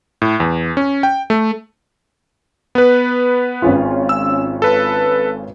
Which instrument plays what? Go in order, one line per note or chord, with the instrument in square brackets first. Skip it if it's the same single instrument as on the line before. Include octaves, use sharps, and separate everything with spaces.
[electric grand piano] A2
E2
C#4
G5
A3
B3 B4
[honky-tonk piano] G#1 C#4 F4
[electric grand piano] E6
A4 B4